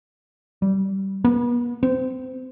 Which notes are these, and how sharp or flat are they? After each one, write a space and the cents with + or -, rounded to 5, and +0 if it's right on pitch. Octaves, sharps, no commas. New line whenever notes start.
G3 -20
B3 -40
C4 -25